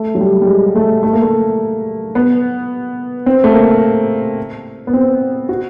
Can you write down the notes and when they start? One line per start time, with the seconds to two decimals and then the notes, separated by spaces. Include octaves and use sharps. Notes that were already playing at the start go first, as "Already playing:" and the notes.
Already playing: A3
0.15 F#3
0.20 G3
0.42 G3
0.47 G#3
0.75 A3
1.03 A3
1.13 A#3
1.23 A3
2.15 B3
3.26 C4
3.44 A3
3.54 A#3
4.87 B3
4.93 C4
5.49 F#4